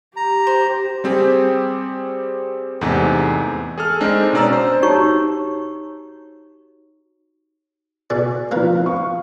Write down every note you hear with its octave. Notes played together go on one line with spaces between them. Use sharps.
G4 A#5
C5
G3 C4 G4 G#4
E2 G#2 C3 A3
G#4 A4 F6
G#3 C4 D4 D#4
B2 C#4 D5 A#5 E6
C5
D#4 F#4 G4 C#5 A#5 C#6
B2 G#4 D5
F3 A#3 C4 A#4 B4
F5 C#6